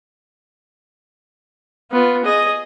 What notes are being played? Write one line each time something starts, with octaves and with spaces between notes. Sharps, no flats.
B3 F4
G#4 D#5